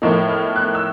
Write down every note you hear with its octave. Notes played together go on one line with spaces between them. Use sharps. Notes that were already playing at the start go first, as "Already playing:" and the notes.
A2 F3 A#3 D#4
F6
F#6
E6